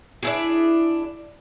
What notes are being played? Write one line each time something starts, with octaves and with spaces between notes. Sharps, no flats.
D4 E4 G#4